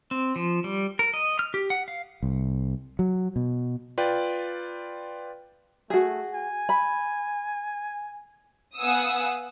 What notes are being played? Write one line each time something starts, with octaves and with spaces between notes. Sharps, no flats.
C4
F3
G3
A#4
D#5
F6
G4
F#5
F5
C2
F#3
B2
F4 B4 D5 G5
A3 F#4 G#4
G#5
B5
B3 F5 F#5 G#5 D#6 E6